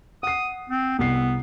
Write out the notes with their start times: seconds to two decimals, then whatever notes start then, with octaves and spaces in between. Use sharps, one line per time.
0.23 F#5 D#6 C7
0.70 C4
0.99 C2 B3 C7